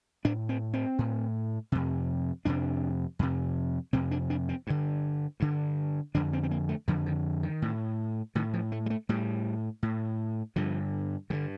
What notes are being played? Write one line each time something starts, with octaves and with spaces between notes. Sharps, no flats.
A2 D4
C4
C4
A2
F2 C3
F2 C3 D4
F2 C3
F2 C3 C4
D4
D4
C4
G2 D3
G2 D3
F2 D3 D4
C4
C4
A#3
A3
F2 D3 F3
D#3
D#3
A2
A2 D#3
F3
A3
G3
A3
A2 G3
A2
G2 D3 F3
G2 D3 D#3